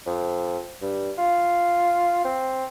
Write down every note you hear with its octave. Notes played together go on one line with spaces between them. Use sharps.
F2
G2
F4
C4